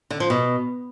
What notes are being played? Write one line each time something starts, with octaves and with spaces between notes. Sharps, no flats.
D3
F3
B2